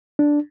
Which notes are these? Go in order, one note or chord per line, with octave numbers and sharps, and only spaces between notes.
D4